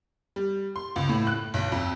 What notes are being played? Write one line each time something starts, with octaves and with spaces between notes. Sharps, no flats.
G3
C6
C#2
A2
F#6
B1
F2